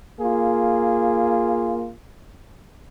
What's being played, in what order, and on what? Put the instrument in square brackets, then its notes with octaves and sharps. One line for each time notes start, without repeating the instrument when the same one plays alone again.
[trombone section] A#3 F4 G#4